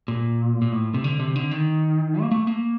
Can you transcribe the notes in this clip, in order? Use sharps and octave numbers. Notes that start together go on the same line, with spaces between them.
A#2
A#2
A2
C3
D3
C3
D3
D#3
A#3
A3
A#3